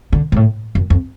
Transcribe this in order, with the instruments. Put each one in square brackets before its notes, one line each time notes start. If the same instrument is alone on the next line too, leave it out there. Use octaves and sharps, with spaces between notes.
[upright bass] D3
G#2
A2
F#2
F2